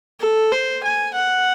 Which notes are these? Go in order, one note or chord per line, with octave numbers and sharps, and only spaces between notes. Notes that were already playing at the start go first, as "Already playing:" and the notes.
A4
C5
G#5
F#5